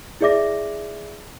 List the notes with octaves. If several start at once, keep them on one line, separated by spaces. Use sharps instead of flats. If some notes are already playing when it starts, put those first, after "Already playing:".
E4 G#4 D5 E5 D6 A#6